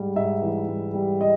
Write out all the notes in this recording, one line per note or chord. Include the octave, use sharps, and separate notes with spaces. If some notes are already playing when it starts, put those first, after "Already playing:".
Already playing: G#2 G3
G#2 E5
E3
G#2
G3
D#5